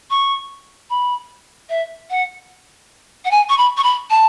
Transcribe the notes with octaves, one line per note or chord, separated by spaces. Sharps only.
C#6
B5
E5
F#5
F#5
G#5
C#6
B5
C#6
B5
A5